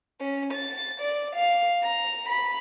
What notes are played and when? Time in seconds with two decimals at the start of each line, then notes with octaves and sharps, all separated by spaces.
0.20 C#4
0.52 A6
0.99 D5
1.34 F5
1.83 A#5
2.28 B5